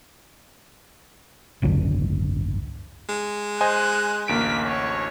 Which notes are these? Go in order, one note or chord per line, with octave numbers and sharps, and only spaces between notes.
G#1 C#2 F#2 D3
G#3
C5 D#5 G#5 F#6
A1 D2 A#3 B6 D7
C#5